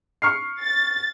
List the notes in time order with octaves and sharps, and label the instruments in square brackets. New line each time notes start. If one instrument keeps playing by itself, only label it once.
[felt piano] C#6 F6 C7
[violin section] A6